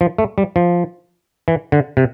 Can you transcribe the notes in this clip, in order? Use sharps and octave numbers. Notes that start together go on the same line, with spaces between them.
F3
A3
G3
F3
E3
D3
C3